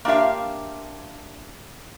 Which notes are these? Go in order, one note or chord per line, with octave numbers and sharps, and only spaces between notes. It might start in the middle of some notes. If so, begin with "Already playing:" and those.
A#3 D4 F4 G4 E5 F5